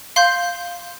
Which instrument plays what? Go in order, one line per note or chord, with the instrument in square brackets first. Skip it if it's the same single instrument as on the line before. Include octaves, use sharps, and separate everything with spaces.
[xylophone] F5 C6 G6